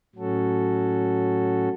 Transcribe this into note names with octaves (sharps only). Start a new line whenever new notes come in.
A2 F#3 C#4 F#4 A4